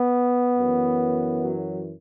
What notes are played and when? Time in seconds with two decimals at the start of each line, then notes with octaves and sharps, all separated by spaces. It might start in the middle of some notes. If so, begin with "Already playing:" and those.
Already playing: B3
0.59 F#2 E3
1.42 F#3